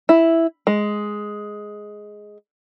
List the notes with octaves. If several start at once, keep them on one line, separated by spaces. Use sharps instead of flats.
E4
G#3